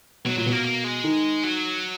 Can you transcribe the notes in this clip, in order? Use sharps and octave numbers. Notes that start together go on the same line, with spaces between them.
B2 F#3
A#2 F#3
B2
A#3
A#3
G#3
D#3
F#3